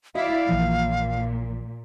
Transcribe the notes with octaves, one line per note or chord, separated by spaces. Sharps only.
E4 F#4 D5 D#5 F5
A#1 A#2 E3 F3